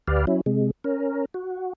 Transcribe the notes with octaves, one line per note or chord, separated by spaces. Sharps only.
D2 G4 B4 D5 F5
F#3 C#4 E4
C3 G#3
C#4 A#4
F#4